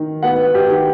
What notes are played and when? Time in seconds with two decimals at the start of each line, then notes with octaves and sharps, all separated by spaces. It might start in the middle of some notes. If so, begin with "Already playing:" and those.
Already playing: D#3
0.23 B3 F#5
0.55 G4
0.70 D#3